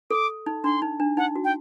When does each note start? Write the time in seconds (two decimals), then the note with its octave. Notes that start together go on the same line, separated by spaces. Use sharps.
0.11 A4 D6
0.46 D#4
0.64 D4 C6
0.82 D#4
1.00 D4
1.17 D#4 F#5
1.36 F#4
1.44 G5